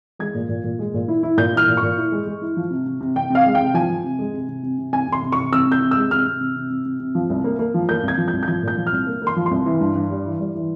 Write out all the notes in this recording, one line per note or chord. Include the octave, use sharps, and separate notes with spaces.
G#3 G#6
A#2
A#2
A#2
G#3
A#2
E4
E4
A#2 G6
E4 F6
A#2
C#6
A#2
E4
G#3
G#3
E4
F3
C3
C3
C3
C3 G5
C3 F5
G#3
G5
C3
F3 G#5
F3
C3
G#3
C3
C3
C3
C3
C3 G#5
C3 C6
C3
C3 C#6
C3 E6
C3 G6
C3
E6
G#3
C3 F6
C3
C3
C3
C3
C3
C3
F3
C2
A#3
A#3
F3
A#3 G6
C2
G#6
F3
G6
C2
G6
F3 G#6
A#2 G6
F3
F6
C2
A#3
A#3
C6
F3
C2 C6
E3
G2
G2
G3
E3
G3
E3